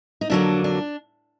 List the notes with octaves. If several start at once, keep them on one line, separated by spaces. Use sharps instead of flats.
D#4
F2 D3 F#3 A#3 D4
D4